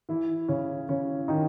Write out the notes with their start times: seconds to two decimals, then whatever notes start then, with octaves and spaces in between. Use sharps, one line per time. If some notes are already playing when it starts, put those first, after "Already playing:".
0.09 E3 E4
0.48 C#3 C#4
0.89 C#3 C#4
1.28 D#3 D#4